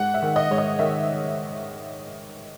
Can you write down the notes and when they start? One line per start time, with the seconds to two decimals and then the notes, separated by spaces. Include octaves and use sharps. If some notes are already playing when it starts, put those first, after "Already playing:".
Already playing: G#2 F#5
0.14 E5
0.22 D#3
0.36 D#5
0.51 G#2 C#5
0.58 D#5
0.79 D#3 E5